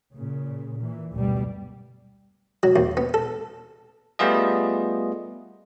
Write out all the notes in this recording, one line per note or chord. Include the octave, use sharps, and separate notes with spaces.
A#2 C#3
A#2 E3
F#1 D2 B2 G3
F#3
D#2
B3
A4
G3 A3 B3 F4 G#4 D#5